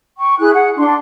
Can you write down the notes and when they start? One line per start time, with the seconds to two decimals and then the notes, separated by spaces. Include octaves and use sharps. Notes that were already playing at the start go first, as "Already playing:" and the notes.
0.18 G5 C#6
0.39 E4 G#4 F#6
0.54 G#4 F#5
0.77 D4 C6